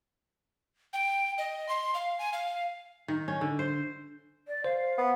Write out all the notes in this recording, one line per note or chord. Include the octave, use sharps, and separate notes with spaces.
G5
D#5
C6
F5
G#5
F5
D#3
C#4
D3
C5
D5
C5 F5
B3